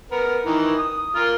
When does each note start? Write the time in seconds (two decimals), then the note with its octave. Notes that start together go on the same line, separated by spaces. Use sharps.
0.11 B3 A#4
0.46 D#3 E3 A#5
0.79 D#6
1.15 A#3 F4 A#4